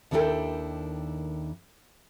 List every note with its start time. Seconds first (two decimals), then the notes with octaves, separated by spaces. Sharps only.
0.11 D#2 D#3 D4 E4 A4 G5